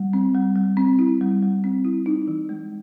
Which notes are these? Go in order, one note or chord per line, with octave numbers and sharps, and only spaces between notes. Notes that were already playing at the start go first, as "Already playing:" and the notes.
Already playing: G3
C4
G3
G3
C4
E4
G3
G3
C4
E4
D#4
E3
G#3